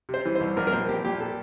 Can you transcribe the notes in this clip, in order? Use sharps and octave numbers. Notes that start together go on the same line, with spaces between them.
C3
C5
E3
C5
C2
A#1 A#4
A#4
A#2 C5
A#1 G4
A#2 G4
A4